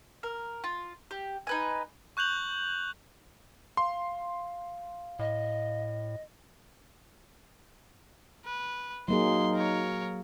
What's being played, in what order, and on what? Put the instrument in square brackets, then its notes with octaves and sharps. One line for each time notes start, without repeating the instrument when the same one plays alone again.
[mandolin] A#4
F4
G4
D#4 B4 G#5
[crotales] C#6 F#6 G6 F7 F#7
[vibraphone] F5 [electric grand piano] C6
[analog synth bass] A2 [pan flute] D#5
[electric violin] B4
[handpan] F#3 A#3 G#4 [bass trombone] D#4 [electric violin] C6
[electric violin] A#4 C#5